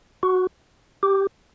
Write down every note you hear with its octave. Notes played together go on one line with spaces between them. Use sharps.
F#4
G4